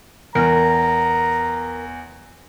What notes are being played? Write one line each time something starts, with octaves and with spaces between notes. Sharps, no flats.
E2 A#4 A#5